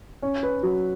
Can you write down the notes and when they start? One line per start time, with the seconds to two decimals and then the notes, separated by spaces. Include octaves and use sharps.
0.22 C#4
0.43 B4
0.63 F#3